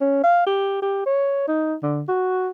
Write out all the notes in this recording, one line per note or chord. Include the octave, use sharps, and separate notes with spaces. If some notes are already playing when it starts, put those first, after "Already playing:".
C#4
F5
G4
G4
C#5
D#4
D3
F#4